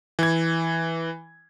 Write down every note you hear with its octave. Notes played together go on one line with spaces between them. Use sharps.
E3 G#6